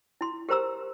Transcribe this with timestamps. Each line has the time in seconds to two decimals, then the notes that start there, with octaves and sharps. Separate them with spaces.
0.21 E4 C6
0.49 G4 A#4 C5 A#5 E6